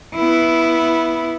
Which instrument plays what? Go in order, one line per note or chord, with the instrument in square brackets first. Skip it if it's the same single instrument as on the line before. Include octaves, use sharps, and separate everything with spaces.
[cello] B3 E4